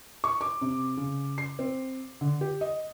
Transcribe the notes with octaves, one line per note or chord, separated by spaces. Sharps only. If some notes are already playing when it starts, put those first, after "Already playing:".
C#6
D6
C3
C#3
C7
C4
D3
G4
D#5